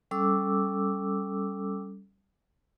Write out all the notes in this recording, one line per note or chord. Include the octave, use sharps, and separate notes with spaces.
G3 C#4 A4 D6 E6